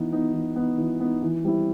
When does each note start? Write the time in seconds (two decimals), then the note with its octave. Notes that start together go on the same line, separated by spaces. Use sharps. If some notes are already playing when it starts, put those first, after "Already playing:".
Already playing: E3 B3 D#4
0.12 B3 D#4
0.34 E3
0.56 B3 D#4
0.78 E3
1.00 B3 D#4
1.22 E3
1.44 G3 C4 E4